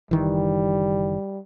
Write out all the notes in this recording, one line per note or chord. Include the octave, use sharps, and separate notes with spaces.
F#1 D#3 E3 G3